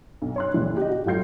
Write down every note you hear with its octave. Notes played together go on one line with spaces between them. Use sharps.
B1
C#5 C6 F#6
C#2 A#2 E3
G4 D#5
F#4
A2 F#3 F4 G6 C7